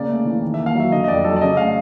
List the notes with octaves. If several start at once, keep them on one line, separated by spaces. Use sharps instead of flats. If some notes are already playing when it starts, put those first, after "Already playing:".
Already playing: C#3 A#3 D5
A3
E3
D#3
E5
A#3
F5
F#3
E5
D3 D#5
D#5
F2 D5
F#3 A4
D5
C#3 D#5
A3 F5